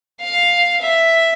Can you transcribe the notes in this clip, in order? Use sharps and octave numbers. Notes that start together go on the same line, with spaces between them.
F5
E5